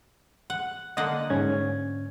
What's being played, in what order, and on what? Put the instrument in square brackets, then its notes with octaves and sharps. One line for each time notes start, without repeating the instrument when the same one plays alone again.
[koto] F#5
[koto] D3 A#3 F#5 [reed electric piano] D#5
[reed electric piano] G#2 C#4 G#6